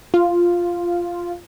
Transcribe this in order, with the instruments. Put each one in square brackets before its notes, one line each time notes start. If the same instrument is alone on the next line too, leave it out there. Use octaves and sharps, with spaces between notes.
[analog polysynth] F4